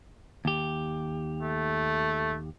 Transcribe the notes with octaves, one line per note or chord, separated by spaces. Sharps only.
D#2 G4
A3